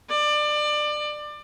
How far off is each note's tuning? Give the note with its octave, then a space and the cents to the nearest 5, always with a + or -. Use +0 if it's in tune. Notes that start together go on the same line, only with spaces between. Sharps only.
D5 +25